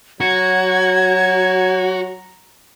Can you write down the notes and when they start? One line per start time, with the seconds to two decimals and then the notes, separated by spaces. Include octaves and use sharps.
0.21 F#3 F#4 A#5 G#6